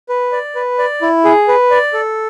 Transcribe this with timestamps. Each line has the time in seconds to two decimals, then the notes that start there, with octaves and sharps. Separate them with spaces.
0.09 B4
0.32 D5
0.55 B4
0.79 D5
1.02 E4
1.25 G#4
1.48 B4
1.71 D5
1.93 A4